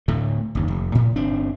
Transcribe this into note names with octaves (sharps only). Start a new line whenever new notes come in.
D1 A2 D3 A3
F#1 D#2
F1
A2
G1 C4 D4